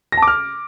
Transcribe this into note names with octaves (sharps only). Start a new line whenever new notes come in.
A#6
A5
D6
F6